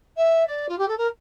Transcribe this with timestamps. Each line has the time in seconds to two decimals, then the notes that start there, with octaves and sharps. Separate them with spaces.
0.16 E5
0.46 D5
0.68 F4
0.78 G4
0.88 A4
0.97 A#4